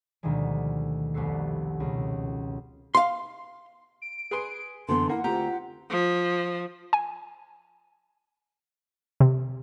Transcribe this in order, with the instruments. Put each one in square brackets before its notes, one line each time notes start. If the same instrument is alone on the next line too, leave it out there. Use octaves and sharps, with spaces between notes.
[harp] D2 B2 D#3 F3 G3 G#3
F1 C2 B3 F#4 A4 C7
C#2 B2
[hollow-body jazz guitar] F5 C6
[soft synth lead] D7
[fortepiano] G#4 B4 C6
[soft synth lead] F#2 [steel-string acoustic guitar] D3 E3 B3 [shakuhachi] C6
[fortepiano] A#3 [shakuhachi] E4 [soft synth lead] F#5
[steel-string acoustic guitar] D2 C4 A#5 [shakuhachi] F4 [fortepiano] G4
[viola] F3
[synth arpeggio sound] G#5
C3